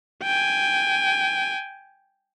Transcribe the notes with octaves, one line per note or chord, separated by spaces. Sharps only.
G5 G#5